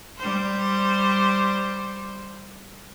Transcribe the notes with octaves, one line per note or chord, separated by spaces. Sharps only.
G3 C5